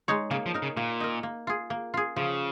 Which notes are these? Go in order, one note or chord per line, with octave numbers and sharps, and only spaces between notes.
G#3 D#4 C#5
C#3 A#3
F3
D#4 A#4
C#3
A#2 A#3
D#4 A#4
A#3
F4 G#4
A#3
F4 G#4
C#3 F3